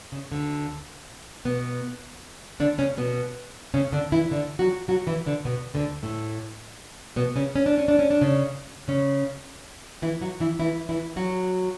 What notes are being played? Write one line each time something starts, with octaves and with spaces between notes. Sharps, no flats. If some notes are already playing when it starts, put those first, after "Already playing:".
C#3
D2 D3
B2 B3
D3 D4
C#3 C#4
B2 B3
C#3 C#4
D3 D4
E3 E4
D3 D4
F#3 F#4
F#3 F#4
E3 E4
D3 D4
B2 B3
D2 D3
A2 A3
B2 B3
C#3 C#4
C#4
D4
C#4
D4
C#4
D4
C#3 C#4
C#3 C#4
E3 E4
F#3 F#4
E3 E4
E3 E4
E3 E4
F#3 F#4